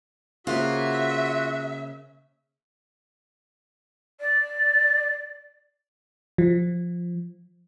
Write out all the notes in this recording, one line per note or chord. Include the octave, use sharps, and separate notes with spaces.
C#3 A#3 F4 F#4 C5 E5
D5
F3